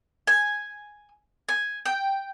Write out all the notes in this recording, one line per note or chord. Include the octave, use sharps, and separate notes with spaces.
G#5
G#5
G5